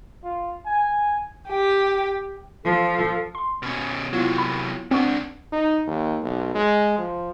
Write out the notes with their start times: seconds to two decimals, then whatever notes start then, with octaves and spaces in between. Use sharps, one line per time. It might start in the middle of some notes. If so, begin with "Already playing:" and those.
0.24 F4
0.66 G#5
1.49 G4
2.64 F3 A4
3.35 C6
3.62 B2 C#4
4.13 C3 F#3 B3 E4 F4
4.38 B5
4.91 C#2 C4 D4 D5 F#5 C#6
5.52 D#4
5.86 D#2
6.23 B1
6.55 G#3
6.98 F3